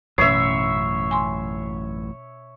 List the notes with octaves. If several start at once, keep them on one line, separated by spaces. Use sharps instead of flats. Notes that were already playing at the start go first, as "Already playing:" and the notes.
A1 F#2 B2 C#4 C#5 E5 C7
G#5 C6